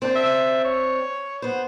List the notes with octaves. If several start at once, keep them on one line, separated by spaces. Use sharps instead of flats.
C4 D4 C5
E5
C#5
B3 C5